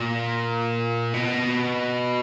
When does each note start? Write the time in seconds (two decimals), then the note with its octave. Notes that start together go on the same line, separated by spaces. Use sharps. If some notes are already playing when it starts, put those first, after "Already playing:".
Already playing: A#2
1.14 B2